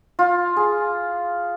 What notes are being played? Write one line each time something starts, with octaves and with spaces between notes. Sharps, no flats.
F4
G#4